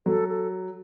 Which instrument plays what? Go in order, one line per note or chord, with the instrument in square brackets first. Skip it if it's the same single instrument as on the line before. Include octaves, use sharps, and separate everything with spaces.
[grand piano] F#3 [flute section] A4
[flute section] A4